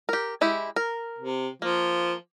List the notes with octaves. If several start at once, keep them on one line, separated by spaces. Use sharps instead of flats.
G4 A#4
G#3 E4 G4
A#4
C3
F3 A#3